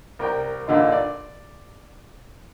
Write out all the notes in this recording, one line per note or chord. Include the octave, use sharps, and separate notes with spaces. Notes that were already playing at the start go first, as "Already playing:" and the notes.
C2 A#4 G5
A#1 A#2 D3 D#4 C6
D5